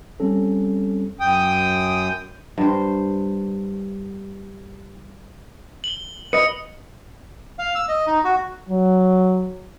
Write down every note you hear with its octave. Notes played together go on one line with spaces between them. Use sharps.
G3 C4 C#4 A4
F#2 G5 D#6
G2 C5
F#7 G7
B4 D#5 D#6 C#7
F5
E6
D#5
D#4
F#4
F#3